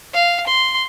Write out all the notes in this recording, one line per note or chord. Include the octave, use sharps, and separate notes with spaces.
F5
C6